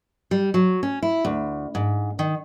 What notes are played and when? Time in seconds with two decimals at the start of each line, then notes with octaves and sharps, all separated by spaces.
0.31 G3
0.54 F#3
0.83 C#4
1.02 E4
1.25 D2
1.75 G#2
2.19 D#3